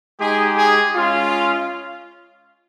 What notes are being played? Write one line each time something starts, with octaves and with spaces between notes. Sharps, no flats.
G#3 D#4 G4 G#4
G#4
G#3 C#4 F4